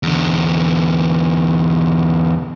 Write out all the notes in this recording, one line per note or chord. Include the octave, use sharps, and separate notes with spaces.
E2 D3